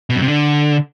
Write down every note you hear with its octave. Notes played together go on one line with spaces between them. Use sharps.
B2
F#2
C3
D3